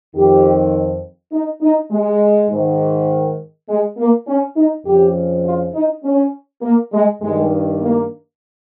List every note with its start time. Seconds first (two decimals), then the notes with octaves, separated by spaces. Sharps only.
0.14 F2 D#3 G4
1.32 D#4
1.62 D#4
1.91 G#3
2.49 G#2 D#3
3.68 G#3
3.98 A#3
4.27 C#4
4.56 D#4
4.85 F2 C#3 F3 G4
5.44 F4
5.73 D#4
6.03 C#4
6.62 A#3
6.92 G#3
7.21 G2 D#3 G#3
7.80 A#3